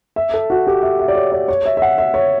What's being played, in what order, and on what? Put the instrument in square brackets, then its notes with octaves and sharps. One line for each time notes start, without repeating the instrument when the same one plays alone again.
[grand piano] E5
A4
F#4
G4
E5
E5
D5
C#5
D5
C#5
E5
E5
F#5
E5
C#5